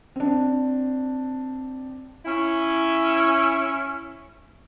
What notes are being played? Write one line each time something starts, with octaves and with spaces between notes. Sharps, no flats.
C4 D4
C#4 E4